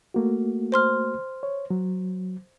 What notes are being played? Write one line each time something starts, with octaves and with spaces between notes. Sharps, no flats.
A3 A#3 F#4
C5 C6 F6
C#5
F#3